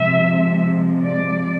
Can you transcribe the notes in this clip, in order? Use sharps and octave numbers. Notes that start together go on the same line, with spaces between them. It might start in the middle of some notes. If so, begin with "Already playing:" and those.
Already playing: C3 F3 G#3 E5
D5